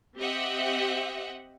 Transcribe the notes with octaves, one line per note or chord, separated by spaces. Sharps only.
C4 G4 D#5 E5 F#5 G5